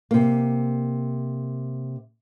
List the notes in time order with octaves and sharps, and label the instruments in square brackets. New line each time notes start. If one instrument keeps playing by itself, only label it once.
[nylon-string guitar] C3 A#3